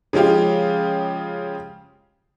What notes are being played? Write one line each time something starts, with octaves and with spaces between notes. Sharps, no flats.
C#3 F3 G#3 F4 G4